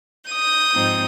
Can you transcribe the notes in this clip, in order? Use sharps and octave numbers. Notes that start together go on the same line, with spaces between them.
D#6 G6
G#2 F3 C4 D#4